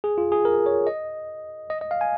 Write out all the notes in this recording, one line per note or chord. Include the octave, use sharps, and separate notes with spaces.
G#4
F4
G#4
A#4
C#5
D#5
D#5
D#5
F5
G#5